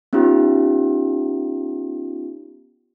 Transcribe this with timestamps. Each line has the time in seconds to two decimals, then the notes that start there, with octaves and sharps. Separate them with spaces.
0.13 B3 C#4 D#4 F4 G4